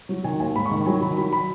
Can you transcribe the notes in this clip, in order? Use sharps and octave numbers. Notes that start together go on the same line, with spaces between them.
F#3
D#3 G#5
D#2 G#5
G#2 B5
C#6
D#3 B5
F#3 G#5
D#3 B5
F#3 B5
B5